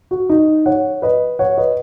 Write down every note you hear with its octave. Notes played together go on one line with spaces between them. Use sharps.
F#4
D#4
C#5 F#5
B4 D#5
C#5 F#5
B4 D#5